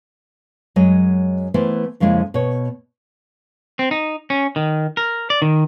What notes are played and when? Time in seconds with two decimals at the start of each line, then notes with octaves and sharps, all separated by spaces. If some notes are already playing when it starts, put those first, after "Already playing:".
0.76 F#2 F#3 G#3 C#5 D#5
1.54 E3 A3 B3 E4 A#4 C5
2.00 F2 C#3 F3 G#3 A#3 E4
2.34 B2 C#5
3.79 C4
3.91 D#4
4.30 C#4
4.56 D#3
4.97 A#4
5.30 D5
5.42 D#3